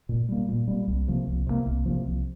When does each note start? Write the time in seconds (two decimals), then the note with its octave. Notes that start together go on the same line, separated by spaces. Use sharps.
0.09 A#2
0.29 G3 A#3
0.48 A#2
0.68 G3 A#3
0.88 C2
1.08 C3 F3 A#3
1.27 C2
1.47 C3 F3 A#3
1.66 C2
1.86 C3 F3 A#3
2.05 C2